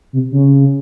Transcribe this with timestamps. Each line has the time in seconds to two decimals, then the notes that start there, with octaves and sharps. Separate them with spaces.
0.13 C3
0.31 C#3